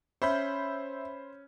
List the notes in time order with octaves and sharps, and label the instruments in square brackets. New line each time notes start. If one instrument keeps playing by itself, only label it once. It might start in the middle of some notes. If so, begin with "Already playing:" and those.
[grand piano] C#4 [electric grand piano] C5 B5 G6 [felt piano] E5